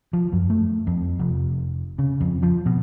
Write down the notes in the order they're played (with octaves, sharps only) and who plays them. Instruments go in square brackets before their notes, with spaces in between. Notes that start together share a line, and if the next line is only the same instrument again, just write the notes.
[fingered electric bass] F3
F#2
A3
F2
F1
C#3
F2
F3
B2